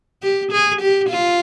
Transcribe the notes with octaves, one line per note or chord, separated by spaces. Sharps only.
G4
G#4
G4
F4